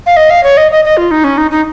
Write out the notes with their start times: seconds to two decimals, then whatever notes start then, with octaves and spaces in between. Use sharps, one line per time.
0.06 F5
0.17 D#5
0.30 F5
0.43 C#5
0.57 D#5
0.71 D#5
0.85 D#5
0.97 F4
1.11 D#4
1.24 C#4
1.38 D#4
1.51 D#4